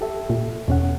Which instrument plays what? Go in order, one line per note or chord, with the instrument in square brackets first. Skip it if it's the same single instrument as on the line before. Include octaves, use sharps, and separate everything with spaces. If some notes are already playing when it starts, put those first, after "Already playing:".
[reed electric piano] G4 A4 E5
[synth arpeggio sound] A#2
[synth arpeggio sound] E2 [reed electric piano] B2 C#4 F#5